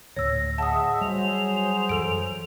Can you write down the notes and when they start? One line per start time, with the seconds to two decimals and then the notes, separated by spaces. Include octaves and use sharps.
0.16 D2 A2 C#5 E6 A#6
0.58 G#4 D#5 E5 F#5 A5 D#6
1.01 F#3 G3 G#4 C5 F7
1.89 F#2 E3 A4 D7